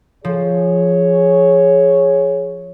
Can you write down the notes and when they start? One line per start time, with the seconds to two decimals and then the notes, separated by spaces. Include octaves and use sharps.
0.25 F3 G#4 C#5